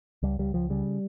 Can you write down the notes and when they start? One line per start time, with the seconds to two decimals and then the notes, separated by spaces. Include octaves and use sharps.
0.23 C#2 G3
0.39 C#2 G3
0.54 C#2 F3
0.70 C#3 G3